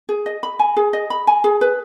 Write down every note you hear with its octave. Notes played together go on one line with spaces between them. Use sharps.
G#4
D#5
B5
G#5
G#4
D#5
B5
G#5
G#4
B4